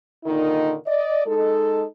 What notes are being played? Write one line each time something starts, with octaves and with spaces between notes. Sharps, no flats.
A#2 D3 D#3 D#4
D5 D#5
G#3 D#4 A4